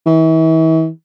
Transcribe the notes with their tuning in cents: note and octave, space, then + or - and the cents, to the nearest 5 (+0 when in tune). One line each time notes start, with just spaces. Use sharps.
E3 -40